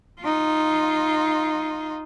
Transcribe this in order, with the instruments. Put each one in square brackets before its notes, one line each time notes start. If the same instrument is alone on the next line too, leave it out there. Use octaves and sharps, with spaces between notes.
[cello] D#4 F4